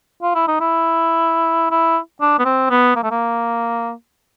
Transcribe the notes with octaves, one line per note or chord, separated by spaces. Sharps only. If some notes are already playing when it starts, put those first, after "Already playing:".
F4
E4
D#4
E4
E4
D4
B3
C4
B3
A#3
A3
A#3